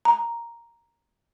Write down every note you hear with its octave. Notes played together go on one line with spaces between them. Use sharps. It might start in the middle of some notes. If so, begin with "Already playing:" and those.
A#5